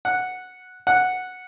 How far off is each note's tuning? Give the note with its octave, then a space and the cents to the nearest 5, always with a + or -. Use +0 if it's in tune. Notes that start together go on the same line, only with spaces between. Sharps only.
F#5 -5
F#5 -5